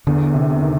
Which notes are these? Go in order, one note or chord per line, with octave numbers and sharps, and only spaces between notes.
E2 D3
C3
D#3